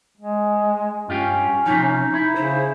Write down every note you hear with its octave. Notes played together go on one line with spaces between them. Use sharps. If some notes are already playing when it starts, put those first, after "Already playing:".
G#3
G2 C#4 F4 G4
C3 F3 D#4
E4
C#3 C5